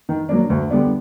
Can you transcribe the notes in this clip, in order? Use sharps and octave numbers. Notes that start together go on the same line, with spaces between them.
D#3
F#3 A#3 D4
D2
D3 G3 B3 D4